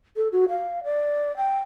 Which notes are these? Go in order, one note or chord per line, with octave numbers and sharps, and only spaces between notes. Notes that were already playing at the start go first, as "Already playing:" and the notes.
A4
F#4
F5
D5
G5